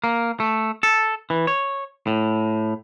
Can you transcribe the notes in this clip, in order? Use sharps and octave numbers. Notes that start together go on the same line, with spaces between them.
A#3
A3
A4
E3
C#5
A2